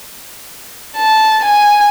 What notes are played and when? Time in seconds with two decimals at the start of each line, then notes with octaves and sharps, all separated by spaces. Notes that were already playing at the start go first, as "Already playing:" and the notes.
0.97 A5
1.44 G#5